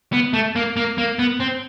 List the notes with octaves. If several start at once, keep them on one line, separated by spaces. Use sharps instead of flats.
B3
A3
A#3
A#3
A#3
B3
C4